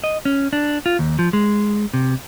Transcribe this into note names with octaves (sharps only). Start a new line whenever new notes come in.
D#5
C#4
D4
F4
D#2
F3
G#3
C3